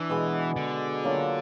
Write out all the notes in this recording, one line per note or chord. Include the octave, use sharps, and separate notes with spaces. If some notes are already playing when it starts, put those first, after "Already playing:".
Already playing: E3 D4
B2 G#3 B3
D3
F#3 A#3 D4 F4